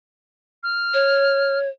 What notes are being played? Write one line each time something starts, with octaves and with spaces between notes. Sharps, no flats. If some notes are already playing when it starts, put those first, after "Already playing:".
F6
C#5